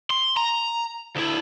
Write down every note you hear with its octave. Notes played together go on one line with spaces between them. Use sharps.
C6
A#5
D2 E4